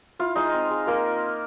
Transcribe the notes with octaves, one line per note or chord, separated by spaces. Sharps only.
E4 F4 F5
G#3 D#4 D#5
C4
G#3
A#3 F4 A#4